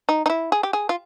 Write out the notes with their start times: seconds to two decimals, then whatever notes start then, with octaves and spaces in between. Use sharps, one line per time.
0.09 D#4
0.26 D#4
0.30 E4
0.52 G#4
0.63 G4
0.73 G#4
0.89 F4